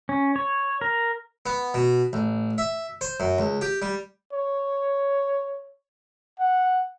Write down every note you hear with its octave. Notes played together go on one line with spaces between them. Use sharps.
C#4
C#5
A#4
B3
B2
A1
E5
C5
F#2
C#2
G4
G3
C#5
F#5